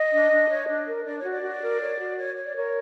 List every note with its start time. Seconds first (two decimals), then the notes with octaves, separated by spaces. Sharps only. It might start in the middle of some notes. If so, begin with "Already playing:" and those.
Already playing: D#5
0.11 D4
0.31 D4
0.50 C#5
0.68 D4
0.86 A#4
1.05 D4 D5
1.18 C#5
1.24 F#4
1.31 D5
1.43 F#4
1.62 A#4
1.80 C#5
1.99 F#4
2.18 C#5
2.37 C#5
2.45 D5
2.56 A#4 C#5